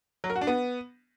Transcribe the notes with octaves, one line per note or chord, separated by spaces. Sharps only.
F#3
A#4
F#4
D4
B3